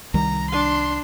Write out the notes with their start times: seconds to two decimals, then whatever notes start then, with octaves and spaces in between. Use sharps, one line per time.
0.14 C2 D#3 G3 A#5
0.50 D4 C6